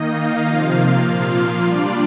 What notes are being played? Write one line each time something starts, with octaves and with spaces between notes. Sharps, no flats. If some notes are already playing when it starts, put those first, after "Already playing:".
Already playing: D#3 A#3 D#4 D#5
F5
C3 F3 A#3 F4 F5
A#2 F3 A#3 F4 F5
G3 D4 F4 D5